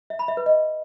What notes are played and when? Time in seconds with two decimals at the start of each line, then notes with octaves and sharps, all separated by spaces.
0.10 E5
0.19 B5
0.28 E5
0.37 B4
0.46 D#5